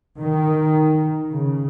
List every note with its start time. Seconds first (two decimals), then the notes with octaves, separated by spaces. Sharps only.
0.20 D#3
1.31 C#3